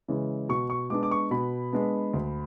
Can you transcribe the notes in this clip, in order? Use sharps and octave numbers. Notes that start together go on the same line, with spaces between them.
C#3 E3 G#3
B2 C#6
C#6
G#3 B3 D4 D6
D6
C#6
B2 B5
G#3 B3 D4
D2